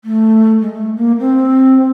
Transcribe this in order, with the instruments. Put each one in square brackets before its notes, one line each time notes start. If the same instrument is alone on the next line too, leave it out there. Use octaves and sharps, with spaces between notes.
[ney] A3
G#3
A3
A#3
C4